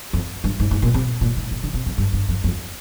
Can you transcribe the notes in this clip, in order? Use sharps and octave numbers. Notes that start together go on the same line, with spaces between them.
F2
G2
G#2
G#2
A#2
C3
A#2
G#2
A#2
D3
C3
F2
G2
G2
F2
F2